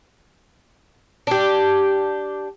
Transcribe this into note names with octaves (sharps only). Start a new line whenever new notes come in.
D4 G4